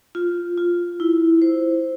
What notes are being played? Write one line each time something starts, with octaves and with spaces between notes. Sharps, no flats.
F4
F4
E4
C5